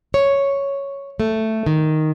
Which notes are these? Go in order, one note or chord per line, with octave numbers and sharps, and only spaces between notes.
C#5
A3
D#3